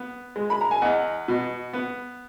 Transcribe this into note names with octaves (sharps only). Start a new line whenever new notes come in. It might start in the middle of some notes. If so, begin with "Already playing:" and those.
Already playing: B3
G#3
B5
A#5
G#5
E2 D#5 F#5
B2
B3